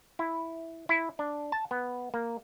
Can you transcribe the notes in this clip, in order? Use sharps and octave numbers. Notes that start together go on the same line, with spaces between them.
E4
E4
D4
A5
B3
A#3